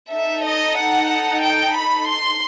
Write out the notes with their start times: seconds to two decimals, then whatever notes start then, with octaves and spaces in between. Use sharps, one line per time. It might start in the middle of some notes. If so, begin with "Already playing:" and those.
0.12 D#4 A4 E5
0.45 D#5
0.78 F#5
1.42 G5
1.75 B5
2.07 C6